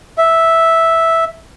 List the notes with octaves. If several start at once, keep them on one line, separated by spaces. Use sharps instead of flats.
E5